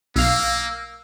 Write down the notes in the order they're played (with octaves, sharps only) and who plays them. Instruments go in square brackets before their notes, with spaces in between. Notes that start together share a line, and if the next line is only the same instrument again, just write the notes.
[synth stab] B1 F5 [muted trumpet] A#3 [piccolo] E6